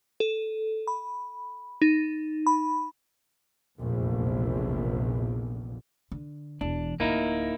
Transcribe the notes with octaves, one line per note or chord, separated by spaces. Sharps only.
A4
B5
D#4
B5
F1 A#1 E2
D3
E1 E3 D4
D1 D2 A#3 D#4 E4